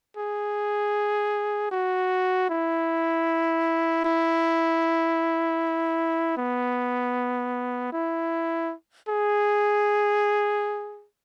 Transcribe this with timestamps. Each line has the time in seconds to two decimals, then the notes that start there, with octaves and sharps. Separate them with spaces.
0.17 G#4
1.72 F#4
2.50 E4
4.05 E4
6.37 B3
7.93 E4
9.09 G#4